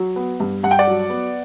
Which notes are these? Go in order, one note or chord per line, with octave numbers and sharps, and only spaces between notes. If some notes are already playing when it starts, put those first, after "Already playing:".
Already playing: F#3
B3
G2
G2 F#5
G5
D5 F#5
F#3
B3